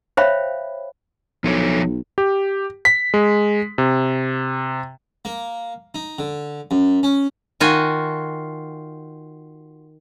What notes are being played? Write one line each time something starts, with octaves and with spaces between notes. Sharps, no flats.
C5 C#5 E5 F5 G5 B5
B1 F3 A4 C#5
G4
B6
G#3
C3
A#3
D#4
D3
F#2
C#4
D#3 F4 F#4 G#5